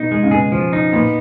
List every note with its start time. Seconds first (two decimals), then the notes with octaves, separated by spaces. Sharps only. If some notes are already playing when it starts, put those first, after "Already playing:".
Already playing: B2 D#4
0.12 G#3
0.23 C#3
0.31 B2 G#4
0.52 F3
0.73 D#4
0.93 A#2 B3